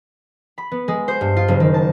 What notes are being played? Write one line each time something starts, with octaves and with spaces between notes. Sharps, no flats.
B5
B3
G#3
C5
G2
F4
F#1
D#3
A5